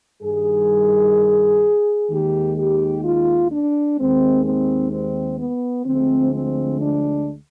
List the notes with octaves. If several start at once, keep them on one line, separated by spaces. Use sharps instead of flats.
G2 D#3 G3 G#4
D#2 D#3 G#3 G4
G4
F4
D4
D#2 D#3 G#3 C4
C4
C4
B3
D2 D3 F3 G#3 C4
C4
D4